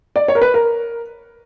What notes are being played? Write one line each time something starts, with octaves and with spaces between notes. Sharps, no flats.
D5
C#5
A#4
B4
A#4